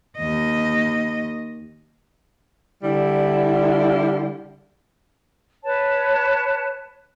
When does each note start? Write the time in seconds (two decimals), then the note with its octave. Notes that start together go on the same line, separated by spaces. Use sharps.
0.18 D#2 D#5
2.83 D3 G3 E4
5.64 B4 C#5 A5